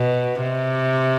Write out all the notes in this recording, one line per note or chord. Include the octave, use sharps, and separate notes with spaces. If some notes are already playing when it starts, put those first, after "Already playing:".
Already playing: B2
C3